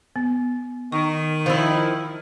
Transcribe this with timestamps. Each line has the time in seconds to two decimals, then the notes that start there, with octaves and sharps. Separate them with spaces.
0.16 B3
0.92 D#3 C#6
1.46 F3 E4